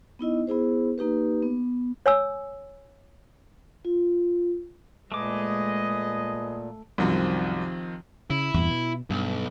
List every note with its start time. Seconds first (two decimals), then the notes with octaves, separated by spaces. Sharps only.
0.19 B3 D#4 E4 D#5
0.47 B3 E4 G#4 C5
0.98 A#3 D#4 G4 B4
1.42 B3
2.06 C#5 G#5 E6
3.85 F4
5.12 A#2 G#3 A3 G#4 B4 D#5 D6
6.98 C2 F#2 D#3 F3 C4
8.30 C#3 E4
8.54 E2 G2 A#2
8.71 B2
9.10 B1 G2